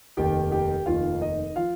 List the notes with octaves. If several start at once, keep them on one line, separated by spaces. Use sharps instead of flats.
F1 D#2 D#3 G4 G5
G4 G5
F1 D#2 D#3 F4 F5
D#4 D#5
F3 F4 F5